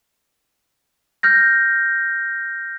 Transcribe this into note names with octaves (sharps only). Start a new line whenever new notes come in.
F6 G6 A#6